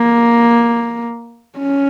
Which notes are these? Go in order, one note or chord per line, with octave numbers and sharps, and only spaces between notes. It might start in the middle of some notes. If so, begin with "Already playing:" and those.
Already playing: A#3
C#4